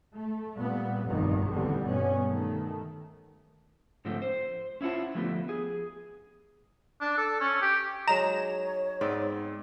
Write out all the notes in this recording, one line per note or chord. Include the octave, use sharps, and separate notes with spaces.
A3
A#2 G3 B3
F1 B1 G2 D#3
A1 E2 D3 G3 B3 C4
G2 B2 B3 C#4
D#3 A3
G#2 D3 F3 A3 C4
C5
C#4 E4 F4 F#5 A5
D3 F3 G3 A3 B3
G#4
D4
A4
C#4
G4
F#3 G#3 D#4 C#5 A#5 E7
G#2 B3 C4 D5